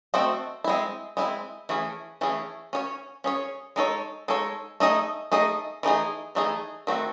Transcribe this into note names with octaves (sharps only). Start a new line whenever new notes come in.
A3 C4 F#4 C5 D#5
G#3 C4 E4
G#3 C4 E4
E3 A3 C#4 G#4
E3 A3 C#4 G#4
C#4 G#4 C#5
C#4 G#4 C#5
G#3 D#4 A4 C#5
G#3 D#4 A4 C#5
A3 D#4 G#4 D#5
A3 D#4 G#4 D#5
E3 A3 D#4 G#4
E3 A3 D#4 G#4
D#3 A3 C4 F#4